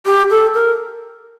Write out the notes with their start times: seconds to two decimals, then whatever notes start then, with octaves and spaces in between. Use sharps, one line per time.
0.06 G4
0.31 A4
0.54 A#4